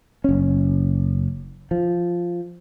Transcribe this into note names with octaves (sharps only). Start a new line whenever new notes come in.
F#1 C#4
F3